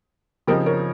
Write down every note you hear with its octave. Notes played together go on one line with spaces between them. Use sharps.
C#3 F3 C4 D#4 G4 A#4
A#4 C#5